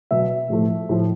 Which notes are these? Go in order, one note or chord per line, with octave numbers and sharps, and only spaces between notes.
B2 F#3 B3 E5
A2 F3 A3
A2 F3 A3